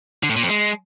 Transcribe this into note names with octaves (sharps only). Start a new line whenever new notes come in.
D3
A2
A#2
F2
G#3